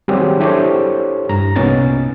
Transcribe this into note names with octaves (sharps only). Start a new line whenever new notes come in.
D#3 F#3 G3 C4 G4 G#4
D4 E4 G4 A4 C5 C#5
G2 A#5
C2 A#2 B3 C#4 D#4 A6